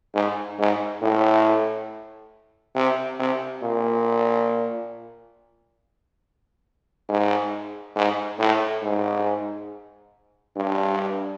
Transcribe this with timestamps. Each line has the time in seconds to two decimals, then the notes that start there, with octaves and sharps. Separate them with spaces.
0.14 G#2
0.59 G#2
1.01 A2
2.75 C3
3.19 C3
3.62 A#2
7.09 G#2
7.96 G#2
8.39 A2
8.82 G#2
10.56 G2